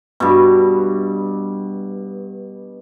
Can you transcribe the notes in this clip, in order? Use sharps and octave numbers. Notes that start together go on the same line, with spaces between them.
G2 B2